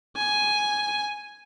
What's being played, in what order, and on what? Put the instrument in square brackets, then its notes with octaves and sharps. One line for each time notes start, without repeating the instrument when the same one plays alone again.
[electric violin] G#5